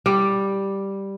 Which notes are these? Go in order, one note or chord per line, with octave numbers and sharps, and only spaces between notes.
G3